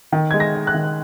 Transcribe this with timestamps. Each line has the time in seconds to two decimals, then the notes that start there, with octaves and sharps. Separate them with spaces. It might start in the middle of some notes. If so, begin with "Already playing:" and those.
0.12 D#3
0.31 G#3 G#6
0.40 A#6
0.55 D#4
0.67 F#6
0.74 D#3